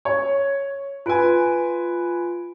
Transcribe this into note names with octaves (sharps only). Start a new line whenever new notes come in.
C#5
F4 B4 G#5 D7